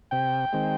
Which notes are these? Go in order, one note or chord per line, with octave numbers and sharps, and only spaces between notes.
C3 G5
D#3 G#3 C4